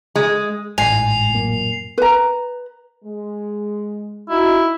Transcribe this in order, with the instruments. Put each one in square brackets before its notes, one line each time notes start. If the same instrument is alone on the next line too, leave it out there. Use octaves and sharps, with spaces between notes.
[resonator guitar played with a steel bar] G#3
[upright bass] A1 D#3 [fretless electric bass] G#2 [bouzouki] G#5 [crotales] C7 F7
[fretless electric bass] F#2 A#2 A#3
[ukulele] B4 A#5
[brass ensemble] G#3
[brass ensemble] D#4 F#4 [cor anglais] E4